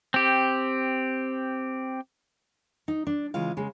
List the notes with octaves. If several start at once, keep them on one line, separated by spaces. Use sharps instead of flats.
C4 G4
D#4
D4
C#3 E3 G#3 F4 F5
C#3 G#3